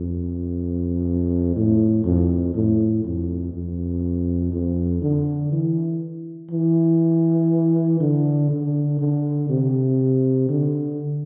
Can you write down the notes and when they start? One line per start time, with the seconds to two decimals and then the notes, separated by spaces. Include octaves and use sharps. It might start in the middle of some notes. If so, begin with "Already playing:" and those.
Already playing: F2
1.56 A2
2.05 F2
2.55 A2
3.05 F2
3.53 F2
4.52 F2
5.02 D3
5.52 E3
6.51 E3
8.00 D3
8.50 D3
8.99 D3
9.49 C3
10.49 D3